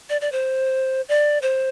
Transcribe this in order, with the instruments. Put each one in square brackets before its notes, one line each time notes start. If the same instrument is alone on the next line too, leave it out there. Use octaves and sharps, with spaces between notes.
[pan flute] D5
D5
C5
D5
C5